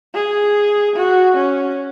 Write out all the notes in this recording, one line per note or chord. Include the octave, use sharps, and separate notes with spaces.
G#4
F#4
C#4